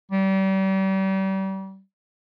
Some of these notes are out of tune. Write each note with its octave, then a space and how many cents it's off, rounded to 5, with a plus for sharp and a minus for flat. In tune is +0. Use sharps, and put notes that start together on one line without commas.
G3 -35